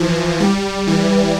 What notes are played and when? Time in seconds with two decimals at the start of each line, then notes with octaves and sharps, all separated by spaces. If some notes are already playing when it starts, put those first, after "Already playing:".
Already playing: E3 F3
0.40 G3
0.87 E3